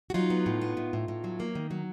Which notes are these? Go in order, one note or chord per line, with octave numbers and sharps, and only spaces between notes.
F#4
F#3 D#4 F4
B3
A2
B3
A2
A2
A2
F#3
A#3
D#3
F#3